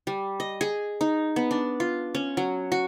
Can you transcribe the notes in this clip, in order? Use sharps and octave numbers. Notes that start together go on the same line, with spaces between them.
G3
D#5
G#4
D#4
B3
D4
F4
C#4
F#3
F#4